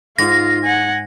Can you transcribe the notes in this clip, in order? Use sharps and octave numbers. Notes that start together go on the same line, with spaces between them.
G#2 F4 A#6
F#5 G#5